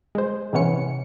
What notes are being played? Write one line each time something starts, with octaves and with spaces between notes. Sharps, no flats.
G#3 C5
G#2 C3 E3 B3 C#4 C#7